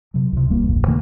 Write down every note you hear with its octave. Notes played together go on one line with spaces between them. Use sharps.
C3 F#3
C#2 C3
D1 C2 G3 A#3
D1 A#1 F2
C3 D#3 A3 A#3